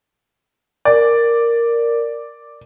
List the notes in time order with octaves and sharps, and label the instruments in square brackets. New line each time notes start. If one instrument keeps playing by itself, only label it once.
[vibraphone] A#4 [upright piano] D5